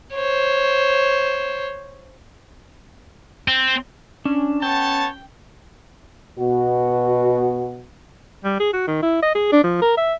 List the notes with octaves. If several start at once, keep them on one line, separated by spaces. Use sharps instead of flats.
C5 C#5
C4
C#4 D4
B3 C#5 G5 A5
B2 F#4
G3
G#4
F#4
D#3
E4
D#5
G#4
D4
F3
A#4
E5